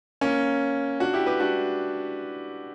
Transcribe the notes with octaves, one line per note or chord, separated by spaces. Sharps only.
A#3 C#4
D4 F#4
E4 G4
G4 B4
D4 F#4